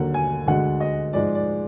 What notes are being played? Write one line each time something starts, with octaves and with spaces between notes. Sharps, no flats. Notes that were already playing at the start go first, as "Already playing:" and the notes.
Already playing: D#2 D3 F#3 A#3 F#5
G#5
D2 D3 G#3 F#5
D#5
G#2 F3 G#3 D5
D5